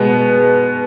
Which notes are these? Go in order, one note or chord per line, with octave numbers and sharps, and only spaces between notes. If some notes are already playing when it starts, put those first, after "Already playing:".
Already playing: B2 G#3 B3